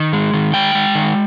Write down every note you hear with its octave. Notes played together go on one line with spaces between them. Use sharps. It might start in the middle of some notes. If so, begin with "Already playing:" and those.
Already playing: D#3
G#3
D#3
G#3 G5
G#3
D#3